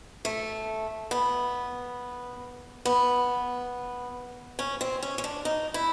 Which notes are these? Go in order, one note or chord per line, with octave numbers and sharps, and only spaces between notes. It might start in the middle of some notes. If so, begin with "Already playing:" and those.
A3
B3
B3
C#4
C4
C#4
C#4
D4
D#4
E4